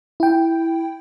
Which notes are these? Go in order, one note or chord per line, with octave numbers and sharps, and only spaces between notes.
E4 G5